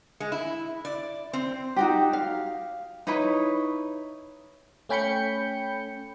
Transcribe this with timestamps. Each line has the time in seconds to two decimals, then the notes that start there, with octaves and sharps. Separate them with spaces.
0.20 G#3
0.32 E4
0.85 D5
1.33 C4
1.76 D#4 F#4 G4
2.13 F5
3.07 D#4 E4 B4 C#5
4.89 A3 C#4 G5 B5 G6 C#7